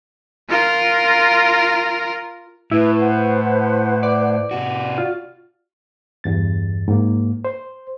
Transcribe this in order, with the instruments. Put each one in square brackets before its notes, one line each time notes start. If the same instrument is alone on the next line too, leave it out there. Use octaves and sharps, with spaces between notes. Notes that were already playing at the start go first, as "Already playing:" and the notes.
[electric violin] F4 A#4
[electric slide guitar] A2 [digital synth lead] E4 [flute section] B4
[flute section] B4 C5 F#5
[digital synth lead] D5
[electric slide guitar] C3 F#4
[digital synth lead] F4 [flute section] F#4 D5
[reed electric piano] E2 G2 A6
G#2 A#3
C5